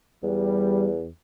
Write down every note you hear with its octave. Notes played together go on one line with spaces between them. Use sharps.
E2 G3